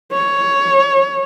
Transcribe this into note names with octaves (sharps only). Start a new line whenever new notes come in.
C#5